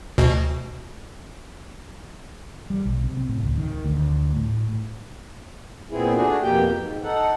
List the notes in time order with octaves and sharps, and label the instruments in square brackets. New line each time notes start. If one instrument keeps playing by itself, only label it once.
[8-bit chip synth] D2 B2
[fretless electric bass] G3
B1
C3
C4
A2
C#2
D#3
D2
A2
[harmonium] A#2 B3 C4 E4 G#4
A3 D4 F#4 G#4
F2 B2 A#3 G4 G5
G#2
D#4 A4 F#5